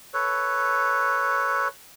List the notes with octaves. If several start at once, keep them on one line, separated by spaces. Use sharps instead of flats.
A4 B4 C#5